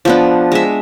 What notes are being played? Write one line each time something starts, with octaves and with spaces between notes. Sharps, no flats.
F3 B3 D4
G#3 E5